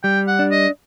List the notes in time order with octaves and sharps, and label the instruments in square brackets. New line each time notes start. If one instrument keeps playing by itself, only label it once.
[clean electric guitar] G3 [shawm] G5
[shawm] F#5
[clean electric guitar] D4
[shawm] D#5